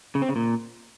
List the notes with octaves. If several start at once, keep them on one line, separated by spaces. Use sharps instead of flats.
C#3
C4
C#3
A#2